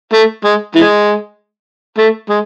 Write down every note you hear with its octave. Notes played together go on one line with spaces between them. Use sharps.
A3
G#3
E3 G#3
A3
G#3